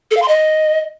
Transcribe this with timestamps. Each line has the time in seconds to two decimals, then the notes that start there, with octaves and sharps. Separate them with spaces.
0.11 A4
0.17 F5
0.22 C6
0.28 D#5